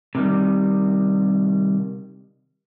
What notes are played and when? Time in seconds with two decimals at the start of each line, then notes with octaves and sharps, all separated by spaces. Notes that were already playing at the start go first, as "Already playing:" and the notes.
0.15 C3 D#3 G3